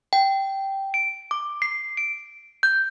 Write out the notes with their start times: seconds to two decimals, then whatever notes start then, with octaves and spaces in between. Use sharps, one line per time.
0.13 G5
0.94 D7
1.31 D6
1.62 C7
1.97 D7
2.63 G6